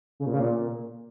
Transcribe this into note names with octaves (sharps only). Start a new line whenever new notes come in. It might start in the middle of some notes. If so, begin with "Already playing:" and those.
C#3
A#2
C#3
A#2